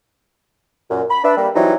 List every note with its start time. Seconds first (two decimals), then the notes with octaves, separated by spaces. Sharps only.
0.90 F#2 A#2
1.10 B5
1.23 D4 B4 E5
1.37 G3 A#3
1.55 E3 F#3 G3 C4 D#4 E4